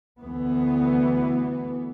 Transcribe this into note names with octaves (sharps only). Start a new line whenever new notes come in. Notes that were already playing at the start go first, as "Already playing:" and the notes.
D2 E3 B3